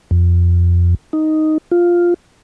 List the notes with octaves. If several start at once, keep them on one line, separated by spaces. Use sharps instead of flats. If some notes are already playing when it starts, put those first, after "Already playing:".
F2
D#4
F4